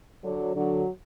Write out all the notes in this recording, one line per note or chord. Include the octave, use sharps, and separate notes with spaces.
D3 F#3
D3 F#3